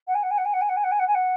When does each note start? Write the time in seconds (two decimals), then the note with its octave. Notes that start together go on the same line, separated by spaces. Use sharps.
0.07 F#5
0.14 G#5
0.23 F#5
0.30 G#5
0.37 F#5
0.45 G#5
0.53 F#5
0.61 G#5
0.69 F#5
0.76 G#5
0.84 F#5
0.91 G#5
0.99 F#5
1.07 G#5
1.14 F#5